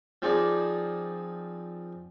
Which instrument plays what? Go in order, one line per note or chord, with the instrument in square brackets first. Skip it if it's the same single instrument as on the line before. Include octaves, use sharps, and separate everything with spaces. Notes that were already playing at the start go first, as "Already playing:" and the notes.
[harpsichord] F3 C4 D#4 G#4 D5